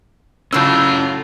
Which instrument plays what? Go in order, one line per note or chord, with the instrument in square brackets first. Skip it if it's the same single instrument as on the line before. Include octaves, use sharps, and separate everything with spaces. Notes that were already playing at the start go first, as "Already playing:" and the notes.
[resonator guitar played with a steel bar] A2 C#3 F#3 [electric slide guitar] C#4 A5 [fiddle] F4 [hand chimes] E6